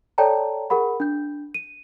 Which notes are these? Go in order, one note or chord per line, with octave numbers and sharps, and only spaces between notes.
A4 C#5 D5 G5 A5 A#5
G#4 A#4 F#5 B5
D4 G6
D#7